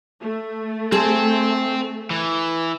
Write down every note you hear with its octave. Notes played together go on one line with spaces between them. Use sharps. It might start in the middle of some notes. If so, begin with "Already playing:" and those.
A3
C4 G#4 A4 C5
E3